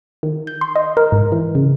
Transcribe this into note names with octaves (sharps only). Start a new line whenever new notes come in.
D#3
G6
C6
D#5
A#4
G#2
E3
C#3